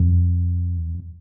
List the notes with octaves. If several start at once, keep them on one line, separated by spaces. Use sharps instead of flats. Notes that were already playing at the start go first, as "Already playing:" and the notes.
Already playing: F2
E2
F2